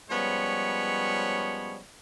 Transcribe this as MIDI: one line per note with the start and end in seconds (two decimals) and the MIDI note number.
0.10 1.80 53
0.10 1.80 55
0.10 1.80 56
0.10 1.80 59
0.10 1.80 61
0.10 1.80 73